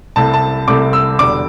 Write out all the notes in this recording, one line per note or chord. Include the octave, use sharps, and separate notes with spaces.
C2 C3 A3 E4 A5
A5
C2 C3 A3 E4 D6
E6
E1 E2 D3 G3 D6